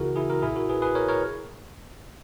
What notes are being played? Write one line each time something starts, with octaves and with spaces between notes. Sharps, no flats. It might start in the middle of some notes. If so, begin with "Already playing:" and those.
Already playing: C#2 C#3 E3 E4 F#4 G#4 A#4
E4 G#4
F#4 A#4
B1 A#2 E4 G#4
F#4 A#4
G#4 B4
G#4 B4
A#4 C#5
A#4 C#5